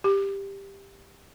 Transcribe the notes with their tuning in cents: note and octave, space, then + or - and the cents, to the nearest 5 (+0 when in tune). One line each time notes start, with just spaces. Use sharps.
G4 +10